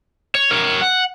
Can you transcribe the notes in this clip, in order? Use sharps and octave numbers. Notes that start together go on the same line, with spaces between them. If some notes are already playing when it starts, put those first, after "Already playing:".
C#5
A#4 C#5
F#5